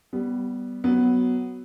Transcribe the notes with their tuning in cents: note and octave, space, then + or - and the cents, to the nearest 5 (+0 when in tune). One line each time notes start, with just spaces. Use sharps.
G3 -15 B3 +0
F#3 +10 B3 +0